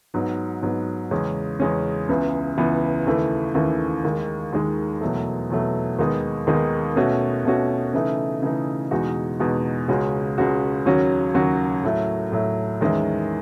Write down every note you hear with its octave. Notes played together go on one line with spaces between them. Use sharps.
G#2 F#3 B3
G#2 F#3 B3
E2 C#3 G#3 C#4
E2 C#3 G#3 C#4
C#2 C#3 E3 B3
C#2 C#3 E3 B3
D#2 C#3 E3 A3 E4
D#2 C#3 E3 A3 E4
D#2 D#3 G#3
D#2 D#3 G#3
E2 B2 F#3 A3
E2 B2 F#3 A3
D#2 D#3 G#3 B3 D#4
D#2 D#3 G#3 B3 D#4
B2 A3 C#4 F#4
B2 A3 C#4 F#4
C#3 E3 A3 D#4
C#3 E3 A3 D#4
E2 B2 G#3 D#4 F#4
E2 B2 G#3 D#4 F#4
C#2 C#3 G#3 C#4 F#4
C#2 C#3 G#3 C#4 F#4
D#2 C#3 F#3 C#4 F#4
D#2 C#3 F#3 C#4 F#4
A2 F#3 A3 E4
A2 F#3 A3 E4
E2 D#3 G#3 C#4 E4